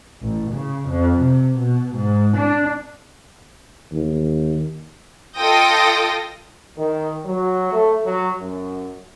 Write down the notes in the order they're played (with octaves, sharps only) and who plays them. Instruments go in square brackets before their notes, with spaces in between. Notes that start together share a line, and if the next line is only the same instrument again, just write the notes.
[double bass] A1
C#3
F2
C3
B2
G#2
D4
[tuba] D#2
[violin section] F4 A4 D#5 G5 D#6 A#6
[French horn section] D#3
F#3
A3
F#3
F#2